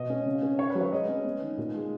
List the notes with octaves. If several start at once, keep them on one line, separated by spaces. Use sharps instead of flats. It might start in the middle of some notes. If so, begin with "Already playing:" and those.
Already playing: B2 D#5
C#4
C#3
C#4
C#4 C#5
B4
F#3
C#5
G#3 D#5
C#4
B3
D#3
A#2
G#3